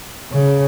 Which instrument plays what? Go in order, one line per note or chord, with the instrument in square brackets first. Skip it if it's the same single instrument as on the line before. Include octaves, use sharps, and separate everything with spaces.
[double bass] C#3